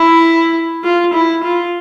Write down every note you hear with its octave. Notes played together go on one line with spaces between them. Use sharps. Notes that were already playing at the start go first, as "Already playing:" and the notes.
Already playing: E4
F4
E4
F4